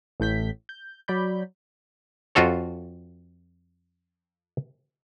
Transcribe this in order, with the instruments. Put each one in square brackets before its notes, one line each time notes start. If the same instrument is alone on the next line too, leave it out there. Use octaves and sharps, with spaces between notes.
[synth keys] A1 A2 G6 B6
G6
F#3 D5 B5 G6
[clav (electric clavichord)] F2 F4 F#4 A4 C#5